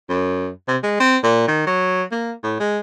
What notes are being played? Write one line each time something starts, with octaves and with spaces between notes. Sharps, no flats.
F#2
C3
G#3
C4
A#2
D#3
F#3
A#3
A2
G#3